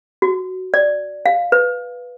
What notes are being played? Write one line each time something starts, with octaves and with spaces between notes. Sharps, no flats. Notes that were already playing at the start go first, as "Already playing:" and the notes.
F#4
D5
F5
B4